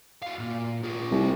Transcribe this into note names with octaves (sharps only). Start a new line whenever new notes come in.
F#4 F5
A#2
F4 G#4
C2